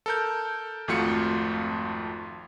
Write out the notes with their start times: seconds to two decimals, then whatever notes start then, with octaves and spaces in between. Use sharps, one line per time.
0.06 A4 A#4 G6
0.88 G#1 F2 A3 F4 F#4 C#7